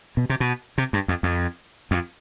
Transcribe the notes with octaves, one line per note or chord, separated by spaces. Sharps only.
B2
C3
B2
C3
G2
F2
F2
F2